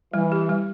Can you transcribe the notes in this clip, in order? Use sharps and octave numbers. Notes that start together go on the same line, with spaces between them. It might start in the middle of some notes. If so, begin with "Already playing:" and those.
E3 G3
G4
G3